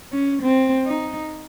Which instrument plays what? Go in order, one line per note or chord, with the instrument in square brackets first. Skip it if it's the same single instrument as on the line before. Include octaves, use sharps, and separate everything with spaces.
[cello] C#4
C4
D#4